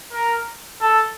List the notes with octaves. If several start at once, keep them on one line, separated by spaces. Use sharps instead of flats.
A#4
A4